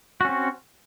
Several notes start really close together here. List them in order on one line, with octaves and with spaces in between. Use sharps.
F#4 C#4 C4